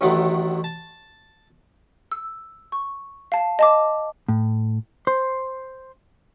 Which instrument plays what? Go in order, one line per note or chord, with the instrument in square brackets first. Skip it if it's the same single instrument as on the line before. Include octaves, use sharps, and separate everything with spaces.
[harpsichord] A1 A2 D3 D#3 F#3 A3
A5
[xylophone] E6
C#6
F5 A5
D#5 A5 D6
[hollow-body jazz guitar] A2
C5